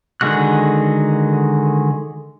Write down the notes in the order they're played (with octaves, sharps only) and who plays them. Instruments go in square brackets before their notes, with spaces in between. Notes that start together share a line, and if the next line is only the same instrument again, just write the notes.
[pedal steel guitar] D3 D#3 G#3 F#4 F#6